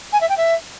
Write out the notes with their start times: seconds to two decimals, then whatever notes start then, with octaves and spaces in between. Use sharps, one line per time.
0.12 G#5
0.20 E5
0.29 G5
0.37 E5